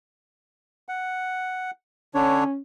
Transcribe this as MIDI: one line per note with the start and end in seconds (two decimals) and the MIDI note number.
0.89 1.71 78
2.15 2.44 50
2.15 2.59 61
2.15 2.44 62
2.15 2.44 73